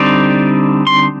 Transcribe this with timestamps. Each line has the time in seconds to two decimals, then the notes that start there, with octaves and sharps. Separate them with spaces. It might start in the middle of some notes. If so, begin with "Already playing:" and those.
Already playing: D3 G3 C4 D#4 D5
0.87 C6